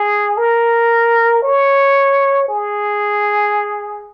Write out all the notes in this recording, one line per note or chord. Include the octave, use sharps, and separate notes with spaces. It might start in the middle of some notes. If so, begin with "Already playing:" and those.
Already playing: G#4
A#4
C#5
G#4